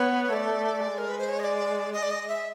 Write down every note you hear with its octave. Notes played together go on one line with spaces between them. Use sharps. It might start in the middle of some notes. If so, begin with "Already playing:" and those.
Already playing: B3 C#5
A3 D5
G#3
A#4
B4
C5
C#5
D#5
D5
D#5
D5
D#5
E5